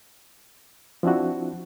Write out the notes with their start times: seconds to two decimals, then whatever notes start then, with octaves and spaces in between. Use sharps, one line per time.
1.03 F3 C4 D4 E4 F#4